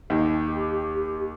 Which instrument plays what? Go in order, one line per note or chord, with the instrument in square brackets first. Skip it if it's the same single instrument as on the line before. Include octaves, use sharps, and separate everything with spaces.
[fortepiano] D#2 D#4 [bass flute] G4